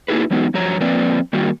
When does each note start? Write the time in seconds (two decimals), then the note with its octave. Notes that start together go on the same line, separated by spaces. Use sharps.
0.08 A#3 D#4 E4 F#4 G#4 B4
0.31 E3 F#3 G#3 B3 D#4
0.54 G2 F3 F#3 C#5 A#5
0.80 F3 A#3 C4 B4 D5
1.33 D#3 G3 A#3 F#4